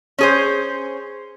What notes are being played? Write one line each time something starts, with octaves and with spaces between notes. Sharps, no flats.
C#4 G#4 C5